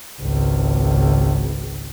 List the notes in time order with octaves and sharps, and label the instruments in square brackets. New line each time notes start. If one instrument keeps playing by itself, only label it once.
[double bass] G#1 C#2